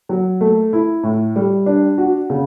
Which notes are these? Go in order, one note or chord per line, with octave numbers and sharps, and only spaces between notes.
F#3
A3
E4
A2
G3
D4
F#4
C#3